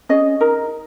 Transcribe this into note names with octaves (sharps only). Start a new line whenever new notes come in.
C#4 G#4 D#5
D#4 A#4